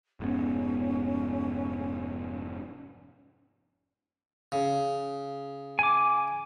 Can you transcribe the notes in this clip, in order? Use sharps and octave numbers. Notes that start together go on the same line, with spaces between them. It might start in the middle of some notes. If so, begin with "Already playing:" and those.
F1 G#2 B3 C#4
C#3
G#5 D6